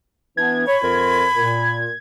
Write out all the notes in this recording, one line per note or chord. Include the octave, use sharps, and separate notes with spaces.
E3 B3 D4 G#6
C#5 B5
F2 F4 A#4
A#2